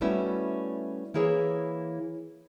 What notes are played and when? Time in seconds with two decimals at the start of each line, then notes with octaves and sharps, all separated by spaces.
0.01 G3 A3 B3 C#4 E4 F#4
1.14 E3 A#3 E4 G#4 C#5